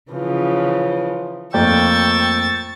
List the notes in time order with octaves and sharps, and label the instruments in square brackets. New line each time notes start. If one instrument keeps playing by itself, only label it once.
[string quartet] C#3 E3 F3
[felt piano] F2 A3 A#3 [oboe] G5 [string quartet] C#6 E6 [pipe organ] A6